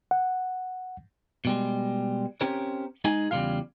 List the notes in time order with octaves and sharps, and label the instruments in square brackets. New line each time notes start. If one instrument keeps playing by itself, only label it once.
[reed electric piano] F#5
[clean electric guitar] B2 G3 G#3
C4 C#4 G4 A#4 C5 C#5
G#3 D#4 G#4 G#5
E2 C#3 G3 G#3 F4 F5